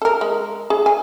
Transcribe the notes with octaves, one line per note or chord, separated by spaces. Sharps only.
A4 A#4
G#3
G#4
G#5